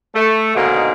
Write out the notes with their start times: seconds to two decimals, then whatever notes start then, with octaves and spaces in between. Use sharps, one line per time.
0.14 A3
0.55 G#2 B2 D3 D#3 A#3